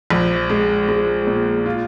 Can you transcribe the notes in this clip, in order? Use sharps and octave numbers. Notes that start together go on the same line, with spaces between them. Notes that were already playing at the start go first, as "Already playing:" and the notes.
A#1
G#3
G#3
A#2
F4